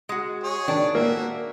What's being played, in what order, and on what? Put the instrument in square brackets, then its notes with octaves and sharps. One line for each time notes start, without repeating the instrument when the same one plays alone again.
[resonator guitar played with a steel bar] G#3 F#4
[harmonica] G#4 C#5
[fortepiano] D#3 [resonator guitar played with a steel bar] D4
[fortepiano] A#3 [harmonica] F#4 E5